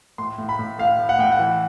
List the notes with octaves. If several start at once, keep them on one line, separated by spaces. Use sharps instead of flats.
A2 C6
A2
B5
A2
A2 F5
A2
F#5
A2 G5
F#5
E3